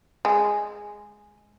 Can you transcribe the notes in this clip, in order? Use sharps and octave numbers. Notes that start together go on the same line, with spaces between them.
G#3